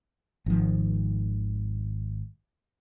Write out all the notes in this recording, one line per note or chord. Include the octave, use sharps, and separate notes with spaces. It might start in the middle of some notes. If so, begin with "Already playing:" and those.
G#1 D#3 F3